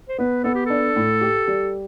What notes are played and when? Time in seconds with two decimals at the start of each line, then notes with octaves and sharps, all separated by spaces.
0.09 C5
0.18 B3 B4
0.44 B3 A4
0.55 G4
0.66 D4 A4
0.96 A2
1.21 G4
1.47 G3